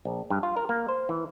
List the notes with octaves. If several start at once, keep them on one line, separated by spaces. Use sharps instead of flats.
A#1
G2
F4
A#4
A#3
C5
E3